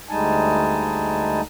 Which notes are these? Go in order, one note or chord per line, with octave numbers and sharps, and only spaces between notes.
D2 G3 G#3 D#4 G#5 A5